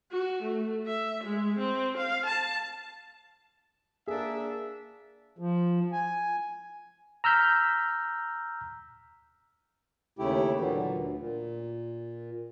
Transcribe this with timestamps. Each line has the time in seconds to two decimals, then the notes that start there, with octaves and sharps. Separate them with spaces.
0.12 F#4
0.43 A3
0.87 E5
1.24 G#3
1.58 C4
1.98 F5
2.26 A5
4.07 A#3 D4 G#4 E5
5.39 F3
5.92 G#5
7.24 A#5 E6 F6 G6 B6
10.19 D#2 C#3 A3 E4 G4
10.58 A#2 D3 E3 F#3
10.93 D2
11.18 A#2